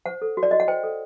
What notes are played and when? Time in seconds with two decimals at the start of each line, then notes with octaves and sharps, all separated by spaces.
0.06 C5 F#5
0.22 A4
0.37 F#4
0.43 D5
0.51 F#4 D#5
0.60 F#5
0.68 C5 G5
0.83 A4